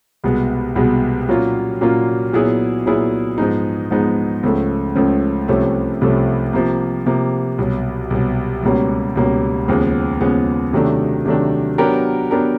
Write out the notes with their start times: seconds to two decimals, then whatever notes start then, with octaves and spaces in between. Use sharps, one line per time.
0.24 C2 B2 G#3 B3
0.75 C2 B2 G#3 B3
1.29 A#2 F#3 A#3 C#4 F4
1.81 A#2 F#3 A#3 C#4 F4
2.33 A#2 F#3 B3 E4 G#4
2.86 A#2 F#3 B3 E4 G#4
3.38 G#2 F3 G#3 B3 D#4
3.91 G#2 F3 G#3 B3 D#4
4.43 C#2 C#3 F3 A3
4.95 C#2 C#3 F3 A3
5.48 C2 C3 F3 A3 C#4
6.01 C2 C3 F3 A3 C#4
6.53 C3 F3 A#3
7.06 C3 F3 A#3
7.58 C2 B2 F#3
8.10 C2 B2 F#3
8.63 C#2 B2 G3 A#3 C#4
9.15 C#2 B2 G3 A#3 C#4
9.68 D#2 C#3 F3 G#3 B3
10.21 D#2 C#3 F3 G#3 B3
10.73 C3 D#3 F#3 A3 D4
11.26 C3 D#3 F#3 A3 D4
11.78 F#3 B3 D4 G4 A#4
12.31 F#3 B3 D4 G4 A#4